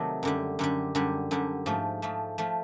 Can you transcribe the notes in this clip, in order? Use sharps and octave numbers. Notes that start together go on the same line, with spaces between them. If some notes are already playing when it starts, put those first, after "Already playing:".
Already playing: C3 D#3 F#3 A3
F#2 D3 G3
F#2 D3 G3
F#2 D3 G3
F#2 D3 G3
G#2 F3 A3
G#2 F3 A3
F3 A3